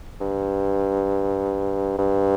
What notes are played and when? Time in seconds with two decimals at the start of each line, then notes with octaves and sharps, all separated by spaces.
0.21 G2
1.98 G2